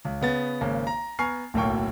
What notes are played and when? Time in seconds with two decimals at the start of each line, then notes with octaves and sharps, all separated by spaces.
0.05 C#2
0.21 C#3 B3 A6
0.61 G#1 C#3 A#3
0.87 A#5
1.19 B3 G#5 A#5 C#6 F6 C7
1.54 D1 B1 A2 A#3 G5 C#6